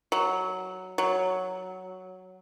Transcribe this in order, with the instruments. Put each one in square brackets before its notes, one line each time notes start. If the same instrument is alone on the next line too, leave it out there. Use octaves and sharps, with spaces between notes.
[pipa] F#3
F#3